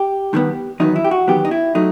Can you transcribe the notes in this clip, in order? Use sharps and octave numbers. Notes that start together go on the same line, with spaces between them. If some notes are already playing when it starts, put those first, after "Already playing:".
Already playing: G4
G2 D#3 G3 B3
E2 D#3 F#3 B3 D#4
E4
G4
F#4
E2 D#3 F#3 B3 G4
D#4
E4
F#3 A3 D#4